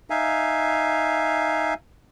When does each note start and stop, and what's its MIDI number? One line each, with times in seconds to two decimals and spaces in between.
0.10 1.74 63
0.10 1.74 76
0.10 1.74 77
0.10 1.74 80